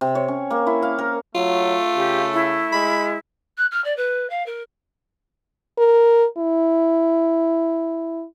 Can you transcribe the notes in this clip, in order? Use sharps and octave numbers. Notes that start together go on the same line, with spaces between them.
C3
C#5
C#4
A#3
E4
F5
A#4
F#3 A3 F4
C#3 G4
E4
G#3 B5
F#6
F6
D5
B4
F5
A#4
A#4
E4